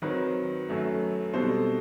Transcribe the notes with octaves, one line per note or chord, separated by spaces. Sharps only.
D#3 F#3 C4 B4
F#2 F#3 A3
B2 G3 C4 D#4 A4 C5